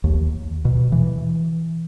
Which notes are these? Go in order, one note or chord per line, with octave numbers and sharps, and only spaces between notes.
D#2
B2
E3